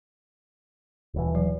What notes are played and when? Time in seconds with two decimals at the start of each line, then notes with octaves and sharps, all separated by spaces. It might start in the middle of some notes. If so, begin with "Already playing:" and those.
1.14 D#1 B2 E3
1.35 F#3